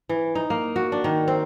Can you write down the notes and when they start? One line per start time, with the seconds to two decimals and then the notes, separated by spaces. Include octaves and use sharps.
0.09 E3
0.35 D#4
0.50 A#3
0.76 F#4
0.92 D4
1.04 D#3
1.28 C4